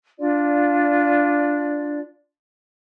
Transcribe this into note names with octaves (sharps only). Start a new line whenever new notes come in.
D4 F4 D5